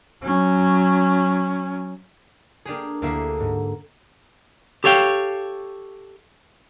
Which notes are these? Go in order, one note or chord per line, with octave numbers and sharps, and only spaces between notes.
F#3 C#4
A#3 D4 G4 G#4
D2 A#3 E4 E5 C7
G#2
G4 A4 C#5 F5 G5